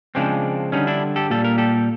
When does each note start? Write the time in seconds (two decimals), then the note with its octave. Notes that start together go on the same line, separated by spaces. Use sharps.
0.15 C#3 F3 G#3 C4 D4
0.72 D3 G3 C#4 D#4
0.87 D4 E4
1.16 G4 A4
1.30 A#2 G3 A4
1.44 A#4
1.58 G4 A4